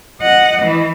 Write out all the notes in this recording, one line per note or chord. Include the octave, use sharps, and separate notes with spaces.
D#5 F#5
E3